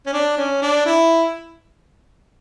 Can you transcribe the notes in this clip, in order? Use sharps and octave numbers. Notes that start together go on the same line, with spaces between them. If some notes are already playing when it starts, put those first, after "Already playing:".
C#4
D4
C#4
D4
E4